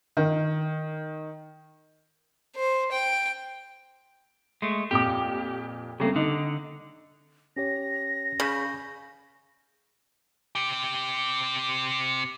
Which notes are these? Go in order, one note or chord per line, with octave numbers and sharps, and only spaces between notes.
D#3
C5
G5
G#3 A3
F2 A#2 G4 D6
C#3 G3 A3 A#3 C4
D3 D#4
C#4 G4 C#5 A#6
C#3 B5 C#6 G6
C3 G4